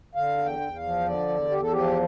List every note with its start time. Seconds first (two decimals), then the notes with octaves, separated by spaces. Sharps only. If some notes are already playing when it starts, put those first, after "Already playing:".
0.15 D3 F5
0.38 E2
0.45 G5
0.61 E2
0.75 F5
0.83 F3
1.01 C5
1.06 D3 D5
1.28 E2
1.51 E2 G4
1.62 A4
1.72 F3 G4